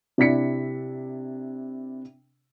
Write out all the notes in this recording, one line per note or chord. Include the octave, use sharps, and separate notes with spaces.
C3 D4 E4 B6 C#7